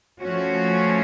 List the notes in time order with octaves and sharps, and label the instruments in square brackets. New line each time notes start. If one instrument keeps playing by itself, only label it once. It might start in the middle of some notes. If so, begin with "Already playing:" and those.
[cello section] F3 A3 C#4 F#4